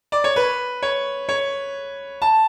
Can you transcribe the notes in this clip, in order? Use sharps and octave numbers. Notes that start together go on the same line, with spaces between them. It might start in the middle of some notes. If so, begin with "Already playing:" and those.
D5
C#5
B4
C#5
C#5
A5